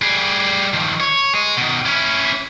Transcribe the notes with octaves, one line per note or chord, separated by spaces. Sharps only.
G3 G#4
D#3 F3
C#5
G#4 D#5
B2 D#3
C#4 E4